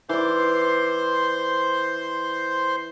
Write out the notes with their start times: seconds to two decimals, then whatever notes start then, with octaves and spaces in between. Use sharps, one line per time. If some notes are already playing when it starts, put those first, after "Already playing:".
0.09 E3 C5 D5 C6